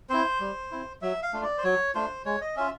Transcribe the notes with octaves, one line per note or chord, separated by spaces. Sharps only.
C4 E4 C5
G3
C4 E4
F#3 E5
F5
A3 D4 F4
D5
C5
F#3 C#5
A3 D4 F4 C5
G#3 C#5
D#5
C#4 F4 E5